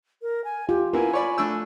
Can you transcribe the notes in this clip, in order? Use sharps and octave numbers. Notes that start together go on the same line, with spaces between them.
A#4
G#5
F4 G4
A#3 B3 E4 F4 G#5
C#5 D5 B5
A3 D4 E6